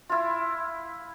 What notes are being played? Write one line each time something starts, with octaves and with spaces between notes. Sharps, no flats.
E4 F4